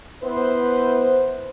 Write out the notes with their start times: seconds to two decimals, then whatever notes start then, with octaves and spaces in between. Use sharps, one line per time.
0.23 B3 E4 B4 C5